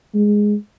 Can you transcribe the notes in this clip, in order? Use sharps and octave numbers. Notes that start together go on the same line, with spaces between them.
G#3